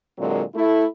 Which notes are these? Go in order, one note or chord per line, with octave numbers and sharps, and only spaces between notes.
A#2 D3 F#3 G#3 A#3 C4
A3 E4